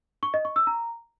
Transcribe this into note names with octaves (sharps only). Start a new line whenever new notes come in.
C#6
D#5
C#6
E6
A#5